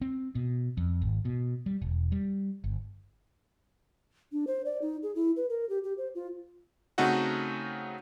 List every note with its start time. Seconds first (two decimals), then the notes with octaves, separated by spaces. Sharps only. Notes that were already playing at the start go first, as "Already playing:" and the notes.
0.01 C4
0.35 B2
0.77 F2
1.02 G#1
1.25 B2
1.66 G3
1.82 E1
2.12 G3
2.64 G1
4.32 D4
4.47 C5
4.65 D5
4.82 D#4
5.03 G#4
5.15 E4
5.37 B4
5.50 A#4
5.69 G4
5.84 G4
5.98 C5
6.15 F4
6.98 C#3 A3 C4 D#4 F#4 F#5